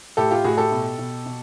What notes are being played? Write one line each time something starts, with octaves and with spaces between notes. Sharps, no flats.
A2 G4 A4
F4 G4
A2 F#4 G#4
G4 A4
B2
B2
B2